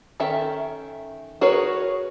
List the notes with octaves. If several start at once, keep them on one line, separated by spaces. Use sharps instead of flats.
D#3 C#4 A4 E5
F#4 G#4 A#4 B4 C#5